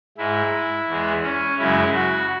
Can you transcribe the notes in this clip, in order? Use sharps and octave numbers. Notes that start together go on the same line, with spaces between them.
G#2 G#3 E4
E2 E3 G#3
C#4
F#2 C#3 G#3 E4
F#4